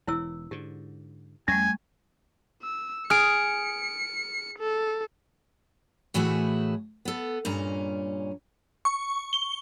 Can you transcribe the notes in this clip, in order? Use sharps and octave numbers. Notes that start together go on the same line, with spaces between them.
E1 E3 E4 C#5 E6
G#2 D3 G4
F2 G3 A3 C#4 G#5 C#6
E6
G#4 F6 C#7 D7
A4
A2 E3 A3 E4 F#4 G#4
B3 A4
G2 A#2 C#4 A#5
C#6
G7